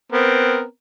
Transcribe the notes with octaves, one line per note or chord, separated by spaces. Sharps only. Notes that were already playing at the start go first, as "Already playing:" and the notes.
B3 C4 A#4